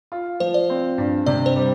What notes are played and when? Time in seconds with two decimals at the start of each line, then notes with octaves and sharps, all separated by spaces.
0.12 F4
0.40 F3 C5
0.54 D5
0.70 C4
0.98 G2
1.26 C3 D5
1.46 C5
1.56 G3